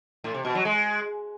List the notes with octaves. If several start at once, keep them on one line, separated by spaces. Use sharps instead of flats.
A2
C3
B2
F#3
G#3